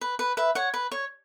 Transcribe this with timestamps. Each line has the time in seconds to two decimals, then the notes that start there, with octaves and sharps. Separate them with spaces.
0.01 B4
0.19 B4
0.37 B4 E5
0.55 C#5 F#5
0.74 B4
0.92 C#5